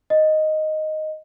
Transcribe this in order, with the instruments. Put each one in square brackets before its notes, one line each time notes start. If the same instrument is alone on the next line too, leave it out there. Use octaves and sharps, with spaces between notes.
[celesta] D#5